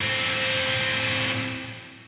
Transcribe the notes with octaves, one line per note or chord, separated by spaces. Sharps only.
A2 C4